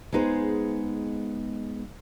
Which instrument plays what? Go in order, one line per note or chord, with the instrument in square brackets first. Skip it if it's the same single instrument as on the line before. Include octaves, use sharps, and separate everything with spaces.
[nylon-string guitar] G#3 B3 D#4 G#4 C5